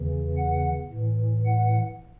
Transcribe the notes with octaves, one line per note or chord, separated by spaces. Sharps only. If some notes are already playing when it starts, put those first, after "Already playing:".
Already playing: E2 C#3 E3
F#5
A2 E3
F#5